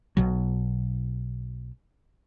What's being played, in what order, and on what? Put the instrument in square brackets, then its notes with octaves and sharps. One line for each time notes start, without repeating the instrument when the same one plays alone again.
[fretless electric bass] B1 B2 F#3